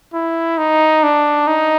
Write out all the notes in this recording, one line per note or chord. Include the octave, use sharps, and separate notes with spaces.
E4
D#4
D4
D#4